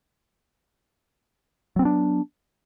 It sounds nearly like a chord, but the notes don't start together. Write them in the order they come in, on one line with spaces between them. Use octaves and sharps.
F#3 C4 B3 D4